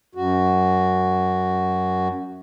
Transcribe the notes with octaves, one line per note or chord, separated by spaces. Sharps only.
F#2 F#4